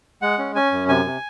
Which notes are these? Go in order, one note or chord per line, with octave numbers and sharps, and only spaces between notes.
G#3 F#5
C#4
C#4 G#5
F#2
C3 G#5
C3